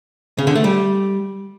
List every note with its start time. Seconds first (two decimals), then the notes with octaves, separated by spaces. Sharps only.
0.38 C#3
0.47 D3
0.56 A3
0.64 G3